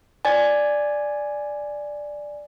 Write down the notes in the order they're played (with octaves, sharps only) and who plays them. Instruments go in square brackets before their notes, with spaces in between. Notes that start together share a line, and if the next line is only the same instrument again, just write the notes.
[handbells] D5 G#5